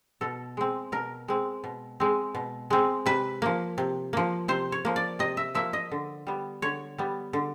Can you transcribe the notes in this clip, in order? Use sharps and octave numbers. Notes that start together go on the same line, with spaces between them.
B2 A4
G#3 C4
B2 A#4
G#3 C4
B2
G#3 C4
B2
G#3 C4
C3 B4
F3 A#3
C3
F3 A#3
C3 C5
C#5
F3 A#3
D5
C3 D#5
E5
F3 A#3 E5
D#5
D3
G3 B3
D3 C#5
G3 B3
D3